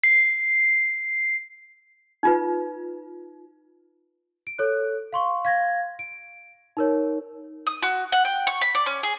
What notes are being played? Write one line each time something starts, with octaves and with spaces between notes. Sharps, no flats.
C7
D#4 F4 B4
D7
A4 C#5 F#6
F5 C6 C#6
F5 G#6 A#6
D7
D#4 A#4 C#5
D#6
F#4
F#5
G5
C#6
B5
D5
C#4
G#4